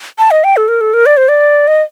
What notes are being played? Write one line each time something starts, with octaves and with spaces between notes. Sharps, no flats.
A5
D#5
G5
A4
A#4
A4
A#4
D5
C5
D5
D#5